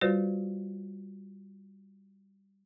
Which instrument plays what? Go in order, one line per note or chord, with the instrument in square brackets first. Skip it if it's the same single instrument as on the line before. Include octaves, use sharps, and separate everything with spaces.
[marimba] G3 F4 F#4 B4 C5 D5